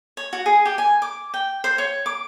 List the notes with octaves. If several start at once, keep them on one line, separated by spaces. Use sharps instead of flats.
C#5
F#4
G#4
G4
G#5
D6
G5
C5
C#5
D6